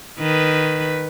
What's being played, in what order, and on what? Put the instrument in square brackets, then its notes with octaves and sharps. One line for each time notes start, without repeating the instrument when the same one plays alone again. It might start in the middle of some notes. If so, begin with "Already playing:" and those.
[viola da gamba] D#3 B4